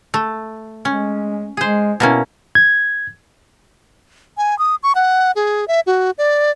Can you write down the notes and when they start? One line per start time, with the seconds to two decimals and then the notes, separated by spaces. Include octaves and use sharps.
0.14 A3
0.85 G#3 C#4
1.57 G#3 G#4 C5
2.00 B2 A#3 C#4 E4
2.55 G#6
4.37 G#5
4.59 D#6
4.83 C#6
4.95 F#5
5.36 G#4
5.68 E5
5.87 F#4
6.18 D5